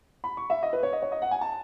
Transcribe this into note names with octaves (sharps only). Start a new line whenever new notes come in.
B5
C#6
E5
D#5
B4
C#5
D#5
C#5
D#5
F#5
G#5
A5